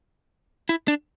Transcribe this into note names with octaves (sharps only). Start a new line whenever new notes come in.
E4
D4